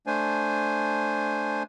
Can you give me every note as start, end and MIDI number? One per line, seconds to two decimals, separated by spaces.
0.07 1.63 57
0.07 1.63 62
0.07 1.63 72
0.07 1.63 80